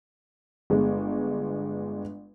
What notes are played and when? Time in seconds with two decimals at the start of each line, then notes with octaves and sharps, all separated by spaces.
0.70 G1 G#3